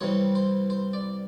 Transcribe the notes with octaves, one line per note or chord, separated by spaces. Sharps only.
C2 C3 E3 G3 C#5
C5
C5
D5